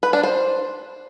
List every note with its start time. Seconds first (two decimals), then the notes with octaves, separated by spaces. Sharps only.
0.03 B4
0.13 D4
0.23 C5